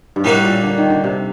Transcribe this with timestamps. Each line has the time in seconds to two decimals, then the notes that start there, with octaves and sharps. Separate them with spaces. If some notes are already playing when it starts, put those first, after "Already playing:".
0.16 G2
0.24 A2 G3 A#3 D#4 F#4
0.44 A#2
0.63 D3
0.78 D#3
0.90 D3
1.04 C3